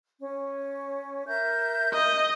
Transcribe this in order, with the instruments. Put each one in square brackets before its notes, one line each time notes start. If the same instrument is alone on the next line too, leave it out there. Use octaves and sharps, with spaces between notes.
[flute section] C#4
A#4 E5 G6
[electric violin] D#5